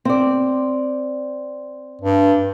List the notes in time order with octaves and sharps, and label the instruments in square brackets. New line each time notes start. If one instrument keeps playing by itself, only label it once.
[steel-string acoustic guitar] C4 D5
[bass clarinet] G2